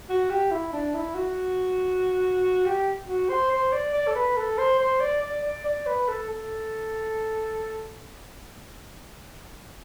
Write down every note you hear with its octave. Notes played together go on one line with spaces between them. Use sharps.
F#4
G4
E4
D4
E4
F#4
G4
F#4
C5
C5
D5
D5
A4
B4
A4
C5
C5
D5
D5
D5
D5
B4
A4
A4